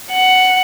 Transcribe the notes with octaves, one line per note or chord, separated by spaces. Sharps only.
F#5